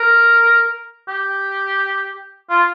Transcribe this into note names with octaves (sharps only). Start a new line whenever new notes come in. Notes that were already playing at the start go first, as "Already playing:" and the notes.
Already playing: A#4
G4
F4